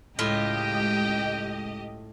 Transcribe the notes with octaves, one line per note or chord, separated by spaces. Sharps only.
C#2 A2 F4 G4 D#5 G5